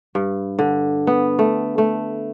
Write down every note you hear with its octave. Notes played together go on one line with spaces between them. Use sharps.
G2
D3
B3
A3
A3